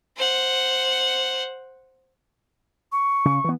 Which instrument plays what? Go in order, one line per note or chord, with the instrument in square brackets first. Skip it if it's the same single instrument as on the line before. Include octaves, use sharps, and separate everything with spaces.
[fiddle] C5 F#5
[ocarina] C#6
[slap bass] C#3
E3 B3